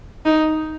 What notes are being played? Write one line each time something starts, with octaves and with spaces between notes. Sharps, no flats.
D#4